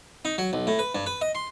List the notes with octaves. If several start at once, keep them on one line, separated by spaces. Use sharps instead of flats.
D#4
F#3
B1
A2
B4
G2
B4
D#5
C6